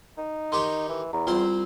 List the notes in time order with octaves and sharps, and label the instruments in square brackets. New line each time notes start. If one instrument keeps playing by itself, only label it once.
[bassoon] D#4
[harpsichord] D#3 G4 C#5 [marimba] C6
[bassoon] E3
[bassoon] E2 [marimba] A#5
[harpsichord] C2 C4 C6 [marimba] F4